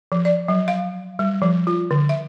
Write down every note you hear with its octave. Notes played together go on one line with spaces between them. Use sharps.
F3
D5
F#3
F5
G3
F3
F4
D3
E5